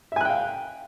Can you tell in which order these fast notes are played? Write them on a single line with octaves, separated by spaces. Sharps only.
E5 G#5 F#6 G5 F5